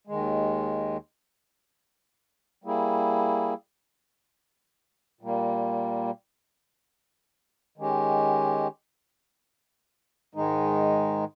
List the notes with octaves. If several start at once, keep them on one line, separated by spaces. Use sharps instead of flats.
D#2 D#3 G#3
G3 A#3 E4 G#4
A#2 G3 A#3
D#3 G#3 C#4 G4
G#2 D#3 G#3 D#4